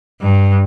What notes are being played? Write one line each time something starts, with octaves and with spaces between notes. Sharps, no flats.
G2